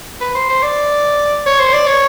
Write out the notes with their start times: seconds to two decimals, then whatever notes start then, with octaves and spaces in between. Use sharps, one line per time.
0.21 B4
0.35 C5
0.49 C5
0.63 D5
1.46 C#5
1.60 C5
1.73 D5
1.87 C#5